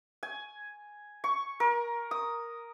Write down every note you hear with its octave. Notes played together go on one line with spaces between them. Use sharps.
G#5
C#6
A#4
D#6